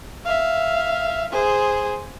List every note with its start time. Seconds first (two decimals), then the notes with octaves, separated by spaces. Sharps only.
0.25 E5 F5
1.32 G#4 C5